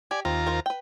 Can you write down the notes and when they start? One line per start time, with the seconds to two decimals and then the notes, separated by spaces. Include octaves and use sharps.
0.11 G4 D5 G#5
0.25 D#2 C4 F4 A#5
0.47 A#4 C5
0.66 B4 G5